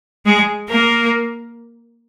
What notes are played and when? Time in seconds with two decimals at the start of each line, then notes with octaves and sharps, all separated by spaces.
0.26 G#3 G#4
0.68 A#3 A#4